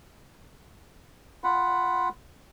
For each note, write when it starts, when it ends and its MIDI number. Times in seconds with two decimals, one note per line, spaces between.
1.44 2.09 65
1.44 2.09 78
1.44 2.09 83